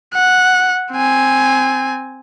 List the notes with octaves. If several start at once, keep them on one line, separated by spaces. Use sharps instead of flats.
F#5
C4 G#5